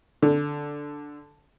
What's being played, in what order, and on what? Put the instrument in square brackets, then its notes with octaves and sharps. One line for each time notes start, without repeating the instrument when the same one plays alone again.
[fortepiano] D3